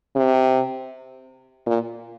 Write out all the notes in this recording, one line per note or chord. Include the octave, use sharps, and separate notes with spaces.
C3
A#2